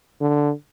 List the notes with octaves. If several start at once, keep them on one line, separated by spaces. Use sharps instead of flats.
D3